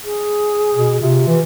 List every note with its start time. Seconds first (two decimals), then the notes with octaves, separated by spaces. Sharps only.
0.04 G#4
0.74 B2
1.01 C3 F4
1.27 E3